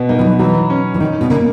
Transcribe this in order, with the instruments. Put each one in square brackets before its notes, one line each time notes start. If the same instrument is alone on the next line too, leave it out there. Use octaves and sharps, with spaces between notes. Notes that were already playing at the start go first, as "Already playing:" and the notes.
Already playing: [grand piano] B2 B3
[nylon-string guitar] A#3 [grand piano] D#4
[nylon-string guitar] E3
F#3
[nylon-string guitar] E3 [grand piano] F#3
[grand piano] C#4
[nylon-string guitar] E3
[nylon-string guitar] D#3 [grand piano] D#4
[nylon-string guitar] B2
[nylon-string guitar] C#3 [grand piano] A#3